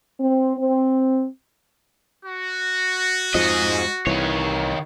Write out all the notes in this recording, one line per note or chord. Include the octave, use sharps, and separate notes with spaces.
C4
C4
F#4
F2 G#2 F3 G#3 D#5
C2 D#3 E3 C#5